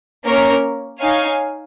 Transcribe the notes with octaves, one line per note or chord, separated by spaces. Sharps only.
A#3 C#4 A#4 C#5
D#4 C#5 F5 G#5